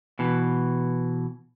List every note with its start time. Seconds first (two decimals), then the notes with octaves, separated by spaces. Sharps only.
0.19 B2 E3